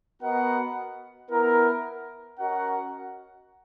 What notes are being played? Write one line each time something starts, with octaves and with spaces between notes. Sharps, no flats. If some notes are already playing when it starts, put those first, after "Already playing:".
B3 F#4 A#4 D#5 F#5
B3 E4 A#4
C#4 F#4 A#4 D#5 F#5